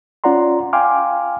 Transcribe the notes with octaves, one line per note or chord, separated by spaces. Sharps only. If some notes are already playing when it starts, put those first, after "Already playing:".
C#4 F4 D5 F#5 A#5 C6
F5 G5 G#5 C6 D6 F6